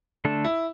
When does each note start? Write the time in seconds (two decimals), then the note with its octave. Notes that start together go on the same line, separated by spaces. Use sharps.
0.25 D3 A3 D4 A4
0.44 E4